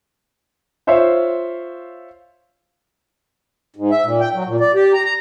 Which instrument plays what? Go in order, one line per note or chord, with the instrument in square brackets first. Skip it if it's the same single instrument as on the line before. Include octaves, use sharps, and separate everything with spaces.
[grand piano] F4 C5 C#5 E5 F5
[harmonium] G#2
E5
A#2
G5
F#3
A#2
D5
G4
A#5
A#5